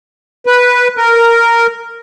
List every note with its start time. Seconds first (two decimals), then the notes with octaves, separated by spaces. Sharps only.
0.46 B4
0.97 A#4